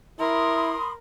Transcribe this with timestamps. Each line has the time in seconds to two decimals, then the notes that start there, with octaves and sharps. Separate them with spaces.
0.19 E4 A#4 B5 C6 D#6